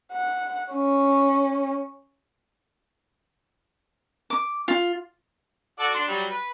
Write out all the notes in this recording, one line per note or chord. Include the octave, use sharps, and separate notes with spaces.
F#5
C#4
D6
F4
F#4 A4 D5
D4 C6
F#3 G3
B4